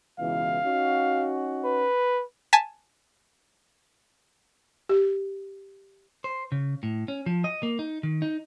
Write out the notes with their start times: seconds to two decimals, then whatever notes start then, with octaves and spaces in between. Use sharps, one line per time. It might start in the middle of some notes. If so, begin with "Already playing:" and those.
0.19 C#2 B2 E3 F5
0.64 C#4 D#4 F#4
1.65 B4
2.53 G#5 A5 B6
4.89 G4
6.24 C5
6.52 C#3
6.83 A2
7.08 C#4
7.26 F3
7.44 D#5
7.63 A#3
7.79 D#4
8.03 D#3
8.22 D#4